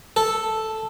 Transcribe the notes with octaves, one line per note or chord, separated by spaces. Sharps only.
A4